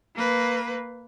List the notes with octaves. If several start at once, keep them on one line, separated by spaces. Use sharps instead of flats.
A#3 B4